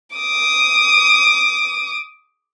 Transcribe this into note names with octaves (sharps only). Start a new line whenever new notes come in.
D6 D#6